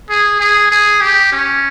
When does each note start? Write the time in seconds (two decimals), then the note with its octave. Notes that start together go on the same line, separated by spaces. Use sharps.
0.09 G#4
0.40 G#4
0.71 G#4
1.01 G4
1.32 C#4